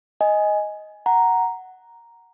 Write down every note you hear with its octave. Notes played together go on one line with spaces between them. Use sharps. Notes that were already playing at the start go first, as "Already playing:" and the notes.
D#5 G#5
F#5 A#5